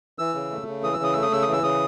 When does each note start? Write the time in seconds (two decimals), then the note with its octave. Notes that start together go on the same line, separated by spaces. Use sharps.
0.19 E3 E6
0.35 C#3
0.51 A3
0.67 C#3
0.83 E3 D#6
0.93 E6
0.99 C#3 D#6
1.13 A3 E6
1.22 D#6
1.31 C#3 E6
1.42 D#6
1.47 E3
1.53 E6
1.63 C#3 D#6